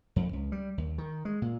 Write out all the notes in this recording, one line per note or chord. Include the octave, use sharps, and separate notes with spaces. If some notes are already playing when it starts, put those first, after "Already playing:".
F2
C#2
G3
D#2
D#3
G#3
A#2